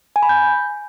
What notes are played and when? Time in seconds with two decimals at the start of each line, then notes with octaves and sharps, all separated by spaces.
0.16 G#5
0.23 B5
0.29 G6